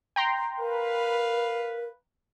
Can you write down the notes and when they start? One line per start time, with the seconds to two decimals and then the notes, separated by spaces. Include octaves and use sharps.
0.16 G5 A#5 C6
0.59 A#4 B4 F5